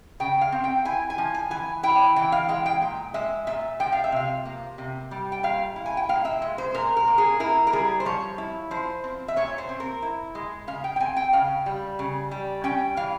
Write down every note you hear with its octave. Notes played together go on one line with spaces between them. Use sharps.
C#3 G5
F5
C4
G5
E4 G#5
G#5
F3
G#5
E3 G#5
E4 G5
E3 G5
F5
G#3 G5
G5
A#2
G#3 E5
A#2 E5
F3 G5
F5
E5
C3 F5
A#3
C3
G3
G5
A#2 F5
E4
G#5
G5
A#2 F5
E5
G#3
C5
A#2 A#4
A#4
A#3
G#4
E4 A#4
A#4
G3 G#4
C5
F3 C#5
E4
F3 C5
C4
E5
A#2 C#5
C5
C4
A#4
E4
G#3
C#3 F5
G5
G5
C4 G#5
G5
C#3 F5
G3
C#3
G3
C#4 G5
E3 F5